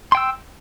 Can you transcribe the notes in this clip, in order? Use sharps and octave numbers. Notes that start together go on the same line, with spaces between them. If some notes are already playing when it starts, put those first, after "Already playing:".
G5 C6 E6